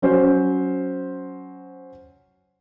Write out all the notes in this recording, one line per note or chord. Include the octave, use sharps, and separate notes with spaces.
F#3 C#4 C5